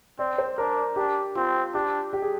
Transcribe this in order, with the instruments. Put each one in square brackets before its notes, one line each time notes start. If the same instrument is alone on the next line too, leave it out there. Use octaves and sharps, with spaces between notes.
[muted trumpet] C4 [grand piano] D5
[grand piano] C5
[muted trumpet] D4 [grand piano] A#4
[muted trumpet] D4 [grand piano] G4
[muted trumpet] C4 [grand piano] F4
[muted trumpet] D4 [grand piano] G4
[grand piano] G4
G#4